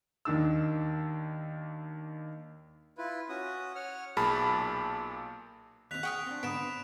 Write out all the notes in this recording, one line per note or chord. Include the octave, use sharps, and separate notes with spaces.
D#2 D#3 D4 E6
E4 F4 B4
C#4 F#4 D#6
C#5 F#5 F6
B1 A#2 G#4 A5 B5 F6
D#2 C4 F#6 B6 F7
G#4 F#5 G5 C#6 D#6 F6
C4 D4
G#2 D3 B3 B5 D#6 D7 E7
C4